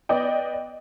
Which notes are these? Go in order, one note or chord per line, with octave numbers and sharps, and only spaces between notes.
B3 D5 D#5 G5